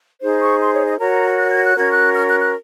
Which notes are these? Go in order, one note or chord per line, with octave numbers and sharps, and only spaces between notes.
D#4 G#4 C5
C#6
C6
C#5
D#5
F#4 A#4 C#5 A#5
F#6
G#6
F#6
C#4 F#4 A#4 G#6
F#6
F6
F#6
F#6